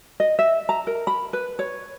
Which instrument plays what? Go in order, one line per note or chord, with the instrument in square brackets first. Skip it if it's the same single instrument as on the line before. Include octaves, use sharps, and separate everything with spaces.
[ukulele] D#5
E5
A#5
A#4
B5
B4
C#5